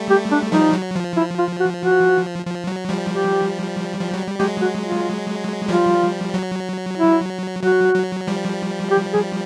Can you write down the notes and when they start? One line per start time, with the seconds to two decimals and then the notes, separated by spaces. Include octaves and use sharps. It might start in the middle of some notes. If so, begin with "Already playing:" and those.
Already playing: G3 A3
0.10 G4
0.31 D4
0.52 F3 G3 D#4
0.73 F#3
0.96 F3
1.16 E4
1.38 F4
1.60 F#4
1.81 F#4
2.46 F3
2.67 F#3
2.89 F3 G3
3.10 G4
4.00 F3
4.14 F#3
4.27 G3
4.39 F#3 G#3 G4
4.61 F#4
4.83 F4
5.68 F3 G3 F4
6.34 F#3
6.98 E4
7.63 F#3 F#4
7.95 F#3
8.27 F3 G3
8.91 G4
9.13 G#4